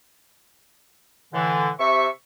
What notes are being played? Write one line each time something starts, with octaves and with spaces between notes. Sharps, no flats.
A2 D3 E3
C3 E5 C#6